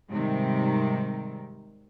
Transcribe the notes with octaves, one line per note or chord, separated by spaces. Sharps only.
G#2 C3 D#3 G3